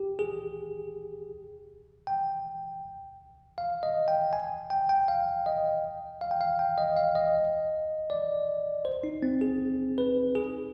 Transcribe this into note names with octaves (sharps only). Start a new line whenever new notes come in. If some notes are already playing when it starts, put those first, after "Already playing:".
Already playing: G4
G#4
G5
F5
D#5
G5
G#5
G5
G5
F5
D#5
F5
G5
F5
G5
D#5
F5
D#5
D5
C5
D#4
C4
G#4
B4
G#4